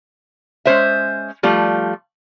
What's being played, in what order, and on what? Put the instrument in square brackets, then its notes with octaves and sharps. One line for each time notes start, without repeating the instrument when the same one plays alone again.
[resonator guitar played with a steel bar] G#3 C#4 C5 E5
F3 G3 A3 F4